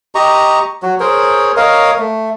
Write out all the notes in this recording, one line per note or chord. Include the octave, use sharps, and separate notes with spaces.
G4 D#5 A#5 C#6
F#3 F#4
G#4 A#4 C5 C#5
A#4 C#5 D#5 F5
A3